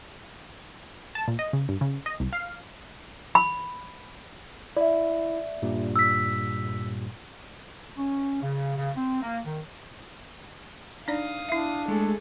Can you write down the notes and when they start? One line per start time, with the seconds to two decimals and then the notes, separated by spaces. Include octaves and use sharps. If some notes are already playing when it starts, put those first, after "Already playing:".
1.15 A5
1.28 A#2
1.39 D#5
1.53 C#3
1.69 G2
1.81 C#3
2.06 D#5
2.20 C2
2.33 F5
3.35 B5
4.76 E4 D5 E5
5.62 G2 A#2 G3
5.96 E6 B6
7.97 C#4
8.42 C#3
8.76 C#3
8.96 C4
9.22 A#3
9.46 D#3
11.08 D4 D#4 D5 F5 D#6
11.49 D4 E4 E5
11.88 G#3 A3 G#4 A4